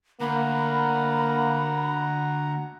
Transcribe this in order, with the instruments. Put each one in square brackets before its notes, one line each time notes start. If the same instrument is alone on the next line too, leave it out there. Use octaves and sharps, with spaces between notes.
[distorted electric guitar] D2 [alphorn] A#3 [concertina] F#5 A#5 [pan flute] B5